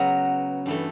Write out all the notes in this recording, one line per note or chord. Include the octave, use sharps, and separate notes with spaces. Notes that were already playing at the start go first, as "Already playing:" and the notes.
Already playing: C#3 F#3 B3 A#5
G2 E3 A3